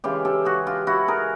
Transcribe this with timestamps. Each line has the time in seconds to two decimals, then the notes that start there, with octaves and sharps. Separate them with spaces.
0.04 C#3 E3 G#3 F4 G4
0.25 G4 A4
0.45 F#4 G#4
0.67 F4 G4
0.87 E4 F#4
1.08 G#4 A#4